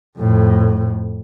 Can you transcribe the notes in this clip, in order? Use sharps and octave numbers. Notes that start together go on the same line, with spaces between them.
F2 A2